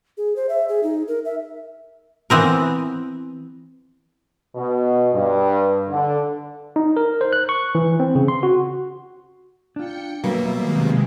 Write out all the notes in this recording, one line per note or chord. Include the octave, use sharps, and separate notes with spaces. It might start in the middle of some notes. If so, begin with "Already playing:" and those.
G#4
C5
E5
G#4
D#4
A#4
E5
E3 B3 C4 A#4
B2
G2
D3
D#4
A#4
C5
F#6
C#6
E3
C4
C#3
C6
F#4
D4 F4 G5 C#7
B2 F#3 G3 A#3 B4 E5
C3 D#3 G#3